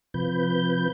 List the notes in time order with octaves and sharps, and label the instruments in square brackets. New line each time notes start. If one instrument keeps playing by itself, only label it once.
[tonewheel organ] C3 F3 B4 G6